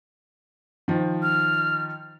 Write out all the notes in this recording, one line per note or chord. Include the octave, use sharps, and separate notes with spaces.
D#3 F3
F6